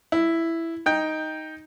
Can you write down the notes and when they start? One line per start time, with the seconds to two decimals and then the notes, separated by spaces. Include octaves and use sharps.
0.12 E4
0.86 D#4 G5